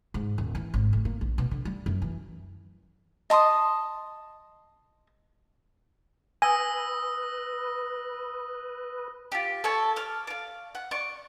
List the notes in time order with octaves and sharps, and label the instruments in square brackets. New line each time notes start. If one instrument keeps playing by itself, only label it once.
[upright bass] G#2
D#1
E3
G#1
A2
A#3
A#1
B2
D3
G3
F#2
E3
[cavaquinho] D#5 A5 C6 D#6
[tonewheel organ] B4 [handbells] G#5 [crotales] D#6 E6 A#6
[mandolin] F4 G4
A4 C#5 A5
D6 F6
D5 F5
F#5
D5 C#6